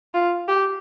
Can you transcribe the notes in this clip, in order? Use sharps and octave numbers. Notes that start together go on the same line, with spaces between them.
F4
G4